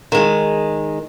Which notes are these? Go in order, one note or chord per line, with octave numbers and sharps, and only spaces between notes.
D#3 G#3